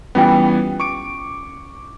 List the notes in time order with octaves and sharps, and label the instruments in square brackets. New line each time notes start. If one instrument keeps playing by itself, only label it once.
[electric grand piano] E3 G3 B3 [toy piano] C#4 F4 G5
[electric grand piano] C#6 D6 D7